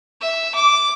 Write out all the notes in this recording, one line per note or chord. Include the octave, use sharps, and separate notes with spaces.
E5
D6